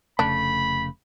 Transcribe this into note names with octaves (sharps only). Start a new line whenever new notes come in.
F1 C#3 A3 D4 B5